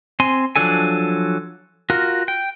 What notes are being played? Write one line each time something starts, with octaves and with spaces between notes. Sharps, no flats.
C4 G#5 C6
F3 F#3 D4 A4 G#5
F4 F#4 A#4
G5